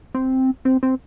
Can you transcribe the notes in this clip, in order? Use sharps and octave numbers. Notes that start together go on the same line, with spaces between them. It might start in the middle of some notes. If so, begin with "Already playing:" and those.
C4
C4
C4